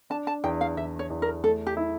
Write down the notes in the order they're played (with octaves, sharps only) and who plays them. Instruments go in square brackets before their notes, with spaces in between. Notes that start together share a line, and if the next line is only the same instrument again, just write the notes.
[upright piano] D4 [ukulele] A5
[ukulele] A5
[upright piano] E2 [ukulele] G5
[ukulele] F5
[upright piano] E2 [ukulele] E5
[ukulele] C#5
[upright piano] E2
[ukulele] A#4
[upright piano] A3 [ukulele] A4
[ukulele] G4
[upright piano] E4